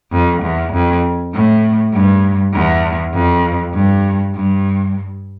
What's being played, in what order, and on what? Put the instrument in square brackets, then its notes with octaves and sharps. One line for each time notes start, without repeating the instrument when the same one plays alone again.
[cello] F2
E2
F2
A2
G2
E2
F2
G2
G2